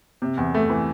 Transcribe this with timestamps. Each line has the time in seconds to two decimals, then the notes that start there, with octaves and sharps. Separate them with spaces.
0.22 C3
0.37 E2
0.54 A3
0.70 E3